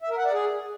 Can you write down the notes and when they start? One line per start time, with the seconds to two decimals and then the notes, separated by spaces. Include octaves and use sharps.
0.02 E5
0.10 A#4
0.17 F#5
0.25 D5
0.33 G#4